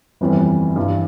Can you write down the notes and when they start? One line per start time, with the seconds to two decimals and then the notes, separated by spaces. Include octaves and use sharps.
0.21 G1 F2 E3 G3
0.76 G2 E3 G3